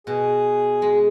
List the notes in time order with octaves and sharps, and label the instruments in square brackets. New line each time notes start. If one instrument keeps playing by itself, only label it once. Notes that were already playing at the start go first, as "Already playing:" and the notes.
[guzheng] B2 [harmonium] G#4
[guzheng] G#3